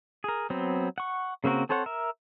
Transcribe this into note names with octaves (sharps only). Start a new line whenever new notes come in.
G#4 A#4
F#3 B3 C4
F#5 C#6
C#3 A#3 C4 F#4 A#4
C4 A4 C5 C#5 F#5
A#4 E5